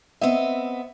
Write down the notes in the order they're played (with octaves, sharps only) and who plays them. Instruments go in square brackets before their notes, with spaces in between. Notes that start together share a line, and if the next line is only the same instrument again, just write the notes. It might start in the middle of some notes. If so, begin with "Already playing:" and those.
[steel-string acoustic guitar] B3 C4 D#5 [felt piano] E5